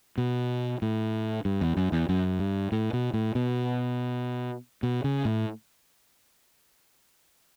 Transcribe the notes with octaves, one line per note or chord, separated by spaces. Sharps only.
B2
A2
G2
E2
F#2
E2
F#2
G2
A2
B2
A2
B2
B2
C#3
A2